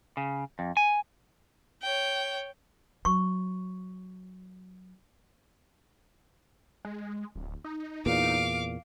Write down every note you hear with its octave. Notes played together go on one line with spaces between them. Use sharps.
C#3
F2
G#5
C#5 G5
F#3 C#6
G#3
D1
D#4
E2 A#2 F5 D6